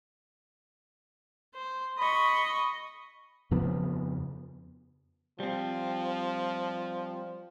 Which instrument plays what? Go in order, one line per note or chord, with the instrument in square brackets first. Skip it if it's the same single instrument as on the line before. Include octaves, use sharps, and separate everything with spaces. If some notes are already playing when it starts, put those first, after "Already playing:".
[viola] C5
[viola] D#5 C#6 [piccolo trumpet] B5
[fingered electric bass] F2 C#3 F3 B3
[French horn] F3 [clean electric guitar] G3 C4